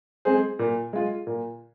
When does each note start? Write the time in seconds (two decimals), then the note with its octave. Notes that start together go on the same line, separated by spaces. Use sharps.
0.25 G#3 C4 G#4 C5
0.59 A#2
0.93 G#3 F4
1.27 A#2